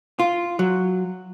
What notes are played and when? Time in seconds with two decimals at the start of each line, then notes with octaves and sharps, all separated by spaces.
0.19 F4
0.59 F#3